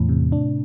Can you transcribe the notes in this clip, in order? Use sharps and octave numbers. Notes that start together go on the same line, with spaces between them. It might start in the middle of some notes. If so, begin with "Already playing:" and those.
Already playing: E2 A2 E3
C3
D4